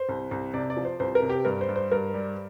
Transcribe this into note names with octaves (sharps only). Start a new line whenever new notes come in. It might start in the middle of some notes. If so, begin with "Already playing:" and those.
Already playing: C5
C2
C2
C3 D5
D5
F3
C5
C2 C5
A#4
C3
G4
G2 A#4
C5
G2
C5
G2 A#4
G3